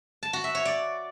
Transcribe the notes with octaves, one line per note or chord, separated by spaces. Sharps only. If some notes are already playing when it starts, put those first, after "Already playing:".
A5
F#4
E5
C#5
D5